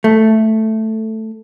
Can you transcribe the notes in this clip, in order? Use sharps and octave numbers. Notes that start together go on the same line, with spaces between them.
A3